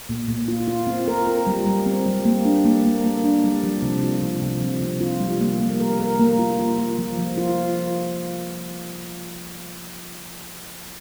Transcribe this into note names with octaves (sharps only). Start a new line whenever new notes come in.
A#2
A#2
F4
F4
C4
A#4
F4
G3
G3
C4
G3
A#3
D4
A#3
A#3
A#3
D4
G3
F3
C3
F4
C3
C3
F3
C3
F4
G3
A#3
A#3
A#4
A#4
A#3
F4
F4
A#3
F3
F3
F4